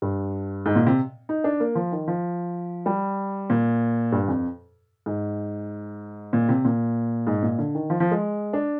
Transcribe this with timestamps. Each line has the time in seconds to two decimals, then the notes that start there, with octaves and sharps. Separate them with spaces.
0.02 G2
0.66 G#2
0.76 A#2
0.87 C3
1.29 D#4
1.44 D4
1.60 A#3
1.75 F3
1.92 D#3
2.08 F3
2.86 G3
3.50 A#2
4.12 G2
4.28 F2
5.06 G#2
6.33 A#2
6.49 C3
6.65 A#2
7.27 G#2
7.43 A#2
7.59 D3
7.75 D#3
7.90 F3
8.00 F3
8.11 G#3
8.53 D4